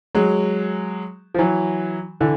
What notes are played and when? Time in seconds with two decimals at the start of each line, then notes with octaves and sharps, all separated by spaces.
0.15 F#3 G#3
1.34 F3
1.38 E3 F#3
2.21 D3 E3